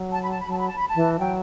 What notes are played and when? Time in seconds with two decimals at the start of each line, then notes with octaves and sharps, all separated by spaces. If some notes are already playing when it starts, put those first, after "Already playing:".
Already playing: F#3
0.12 A5
0.22 B5
0.30 A5
0.41 B5
0.47 F#3 A5
0.59 B5
0.67 A5
0.77 B5
0.87 A5
0.95 E3
1.19 F#3 G5